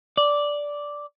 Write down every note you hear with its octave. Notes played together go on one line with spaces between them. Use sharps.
D5